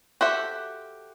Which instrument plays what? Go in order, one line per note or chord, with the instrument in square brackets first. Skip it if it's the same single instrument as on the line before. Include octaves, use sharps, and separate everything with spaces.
[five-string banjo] F#4 G4 A4 C5 E5